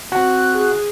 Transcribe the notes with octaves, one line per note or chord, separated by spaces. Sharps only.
C4 F#4 F#6
G#4